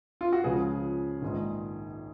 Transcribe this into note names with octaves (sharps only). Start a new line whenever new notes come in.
F4
F#4
C#2 C#3 F3 G#4
A#1 G#2 D#3